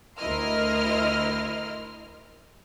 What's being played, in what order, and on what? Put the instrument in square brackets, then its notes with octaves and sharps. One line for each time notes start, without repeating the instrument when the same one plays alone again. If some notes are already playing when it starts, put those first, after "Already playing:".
[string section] D2 E4 A#4 D#5 C6 F6